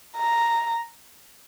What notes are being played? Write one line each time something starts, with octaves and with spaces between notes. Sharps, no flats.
A#5